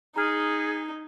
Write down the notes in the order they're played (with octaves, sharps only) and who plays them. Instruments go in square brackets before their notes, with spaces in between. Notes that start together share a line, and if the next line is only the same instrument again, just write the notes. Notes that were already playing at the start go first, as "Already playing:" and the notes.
[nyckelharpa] D#4 [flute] G#4 [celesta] A#5 F6